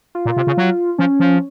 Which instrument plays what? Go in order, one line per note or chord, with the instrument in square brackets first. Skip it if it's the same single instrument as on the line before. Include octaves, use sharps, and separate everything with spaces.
[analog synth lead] F4
[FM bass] A#2
C3
C#3
F#3
[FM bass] F3 [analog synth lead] C#4
[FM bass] F3